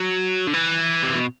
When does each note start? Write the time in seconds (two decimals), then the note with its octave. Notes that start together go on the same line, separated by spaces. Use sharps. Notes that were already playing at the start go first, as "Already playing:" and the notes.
Already playing: F#3
0.47 D3
0.54 E3
1.03 C3
1.15 B2